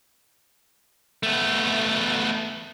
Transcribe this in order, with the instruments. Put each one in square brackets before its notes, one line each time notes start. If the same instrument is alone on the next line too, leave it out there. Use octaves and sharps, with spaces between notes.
[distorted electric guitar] A3 B3